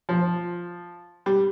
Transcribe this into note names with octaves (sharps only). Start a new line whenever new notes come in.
F3
G3